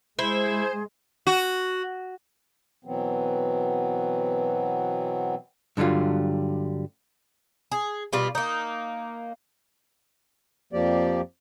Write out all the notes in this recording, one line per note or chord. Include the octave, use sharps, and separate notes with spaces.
G#3 E4 G#4 C5 C6
F#4
B2 E3 F#3 B3 C4
G2 D3 F#3 G3 F4
G#4
B2 G3 F4 D5
A#3 D#4
F2 F3 A#3 G4 D5